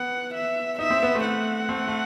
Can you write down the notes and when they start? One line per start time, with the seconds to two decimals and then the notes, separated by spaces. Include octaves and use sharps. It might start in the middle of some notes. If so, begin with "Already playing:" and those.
Already playing: B3 F#5
0.35 E5
0.79 D#4 E5
0.90 C4
1.03 B3
1.15 A3 C4
1.25 F#5
1.69 A3 C4
1.87 A3